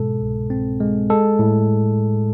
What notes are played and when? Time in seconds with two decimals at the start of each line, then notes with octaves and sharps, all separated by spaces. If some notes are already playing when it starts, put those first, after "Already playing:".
Already playing: G#2 B2 G#3 A4
0.21 C2
0.50 C4
0.80 G#3
1.10 G#3 A4
1.39 A2